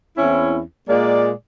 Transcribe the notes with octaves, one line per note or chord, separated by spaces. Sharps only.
E2 C4 C#4 E4
A#2 G#3 A#3 D5